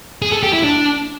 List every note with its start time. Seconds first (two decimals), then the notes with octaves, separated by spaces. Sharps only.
0.22 G#4
0.33 A4
0.43 G4
0.53 E4
0.64 D4